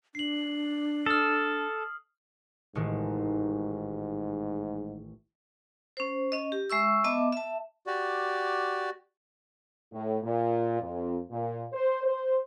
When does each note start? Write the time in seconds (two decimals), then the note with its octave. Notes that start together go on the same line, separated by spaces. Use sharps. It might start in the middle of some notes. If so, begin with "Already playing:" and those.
0.15 D4 C7 F#7
1.06 A4 D#6 F6
2.75 A1 G#2 D#3 G#3
5.97 C#4 C5
6.32 C#4 D#5
6.52 G4
6.70 G#3 E5 C#6 E6
7.04 B3 D#5 E5 A5 D6
7.32 E5 A5
7.87 F#4 G4 D5
9.92 A2
10.23 A#2
10.81 F2
11.30 A#2
11.73 C5
12.04 C5